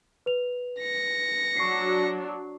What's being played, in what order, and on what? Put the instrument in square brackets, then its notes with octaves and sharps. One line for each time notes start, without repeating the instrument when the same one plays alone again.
[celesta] B4 F7
[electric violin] A#6 C#7
[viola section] F#3 D4 [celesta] C#6 C7